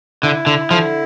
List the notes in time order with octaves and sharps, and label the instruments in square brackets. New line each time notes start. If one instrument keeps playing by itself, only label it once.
[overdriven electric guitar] D3 [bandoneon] E4
[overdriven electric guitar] D3
[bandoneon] D3 [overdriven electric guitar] F3